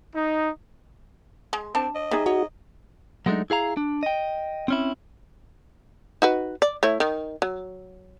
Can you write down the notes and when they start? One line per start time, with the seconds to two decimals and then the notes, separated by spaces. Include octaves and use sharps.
0.15 D#4
1.53 G#3
1.75 C4 D4 A5
1.95 D#5
2.11 G3 D#4 G#4 E5
2.26 F#4 C#5 D#5
3.26 F#3 G#3 A3 C4 D4 D#4
3.50 E4 G#4 F5 A#5
3.77 D4
4.03 D#5 G5
4.68 C4 C#4 E4
6.22 D#4 F#4 B4
6.62 D5
6.83 A3 E4 C#5
7.00 D#3
7.42 F#3